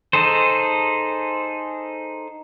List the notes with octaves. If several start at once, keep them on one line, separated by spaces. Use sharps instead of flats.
D#4 G#4 A4 C5